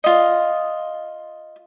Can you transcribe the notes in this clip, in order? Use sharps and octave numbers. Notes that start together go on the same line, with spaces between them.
F4 D#5